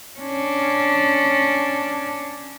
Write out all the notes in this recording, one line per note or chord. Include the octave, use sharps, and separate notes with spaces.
C#4 D4